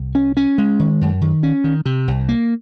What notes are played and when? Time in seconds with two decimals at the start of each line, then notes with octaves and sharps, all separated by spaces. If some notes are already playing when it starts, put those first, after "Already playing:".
Already playing: C2
0.15 C#4
0.37 C#4
0.58 G#3
0.79 D#3
1.01 F#2
1.21 D#3
1.43 C#4
1.64 D#3
1.85 C3
2.08 C2
2.29 A#3